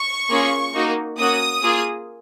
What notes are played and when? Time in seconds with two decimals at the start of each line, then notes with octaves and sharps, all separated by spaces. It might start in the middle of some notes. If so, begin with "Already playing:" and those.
Already playing: C#6
0.29 A#3 C#4 F4 G#4
0.74 A#3 D#4 F#4
1.18 A#3 C#4 F#4 D#6
1.62 A#3 F4 G#4